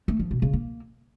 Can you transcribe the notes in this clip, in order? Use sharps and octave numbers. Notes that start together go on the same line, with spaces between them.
A3
F3
B2
C#3
A#3